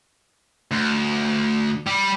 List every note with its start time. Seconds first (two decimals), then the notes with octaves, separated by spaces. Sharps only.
0.71 D2
1.87 G3